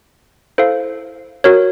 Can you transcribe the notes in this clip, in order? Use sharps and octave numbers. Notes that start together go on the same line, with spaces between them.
E4 A4 C5 F5
F#4 A#4 C#5